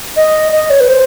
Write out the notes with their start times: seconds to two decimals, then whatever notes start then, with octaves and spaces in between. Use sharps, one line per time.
0.16 D#5
0.52 D#5
0.70 C#5
0.80 B4
0.88 C5